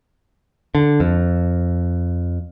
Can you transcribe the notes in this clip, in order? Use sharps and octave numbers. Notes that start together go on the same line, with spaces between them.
D3
F2